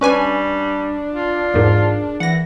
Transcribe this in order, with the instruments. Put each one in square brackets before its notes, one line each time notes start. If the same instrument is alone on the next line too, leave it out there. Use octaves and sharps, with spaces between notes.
[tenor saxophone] G3 [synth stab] C#4 B4 G#5 [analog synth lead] D4 [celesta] C#6
[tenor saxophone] F4
[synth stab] E2 G#2 [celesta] G#4 A#4 D5
[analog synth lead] E3 [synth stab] F#5 A#6